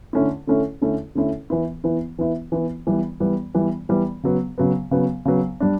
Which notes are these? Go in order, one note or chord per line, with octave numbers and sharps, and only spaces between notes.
D3 A3 C#4 E4
D3 A3 C#4 E4
D3 A3 C#4 E4
D3 A3 C#4 E4
E3 B3 E4
E3 B3 E4
E3 B3 E4
E3 B3 E4
E3 G3 B3
E3 G3 B3
E3 G3 B3
E3 G3 B3
C#3 F#3 B3
C#3 F#3 B3
C#3 F#3 B3
C#3 F#3 B3
G3 D4